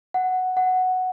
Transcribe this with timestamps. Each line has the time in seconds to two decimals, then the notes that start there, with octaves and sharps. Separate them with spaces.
0.14 F#5
0.57 F#5